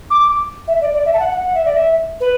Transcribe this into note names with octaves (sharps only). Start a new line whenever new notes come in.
D6
E5
D5
D5
E5
A5
F#5
F#5
F#5
E5
D5
E5
B4